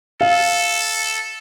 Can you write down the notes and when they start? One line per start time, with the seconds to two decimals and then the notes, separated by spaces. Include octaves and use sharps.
0.21 A4 F5